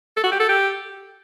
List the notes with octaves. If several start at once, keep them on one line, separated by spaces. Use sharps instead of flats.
A4
F#4
G4
A4
G4